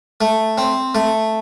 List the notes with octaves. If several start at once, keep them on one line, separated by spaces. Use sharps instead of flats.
A3
C4
A3